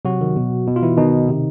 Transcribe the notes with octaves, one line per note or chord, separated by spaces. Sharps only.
C3 F#3 F#4
D#3
B2
B2
F4
E3 E4
B2 D#3 D#4
C3